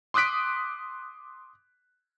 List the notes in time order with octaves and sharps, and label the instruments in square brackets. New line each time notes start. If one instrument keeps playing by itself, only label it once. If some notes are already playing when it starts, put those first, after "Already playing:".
[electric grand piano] C6 D6 D#6 F#6 B6 D7